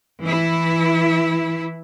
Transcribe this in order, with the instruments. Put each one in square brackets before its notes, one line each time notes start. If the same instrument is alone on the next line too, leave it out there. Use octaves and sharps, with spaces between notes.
[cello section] E3 E4